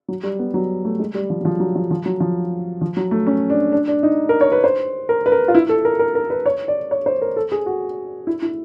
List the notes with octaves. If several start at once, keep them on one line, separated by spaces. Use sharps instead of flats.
F#3
G3
B3
F#3
A3
G#3
G3
F3
F#3
F3
F#3
F3
F3
F#3
F3
F3
F#3
A3
C#4
D4
D4
D4
D#4
A#4
C#5
B4
C5
A#4
B4
A#4
F4
E4
A4
A#4
A#4
A#4
B4
C#5
D5
C#5
C5
A#4
A4
G#4
F#4
E4
E4